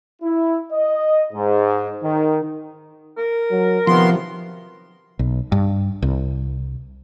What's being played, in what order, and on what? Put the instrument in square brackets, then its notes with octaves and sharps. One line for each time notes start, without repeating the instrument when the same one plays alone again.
[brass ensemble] E4
D#5
G#2
D#3
[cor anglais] A#4
[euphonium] F#3
[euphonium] C3 [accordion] D#3 B3 C6 [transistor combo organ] F3
[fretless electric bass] B1
G2
C2